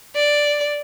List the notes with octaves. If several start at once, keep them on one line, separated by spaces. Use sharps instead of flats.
D5